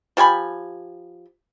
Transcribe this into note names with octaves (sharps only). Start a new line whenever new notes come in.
F3 G4 G#5 B5